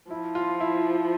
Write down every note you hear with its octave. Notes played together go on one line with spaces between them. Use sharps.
F3 E4
F4
E4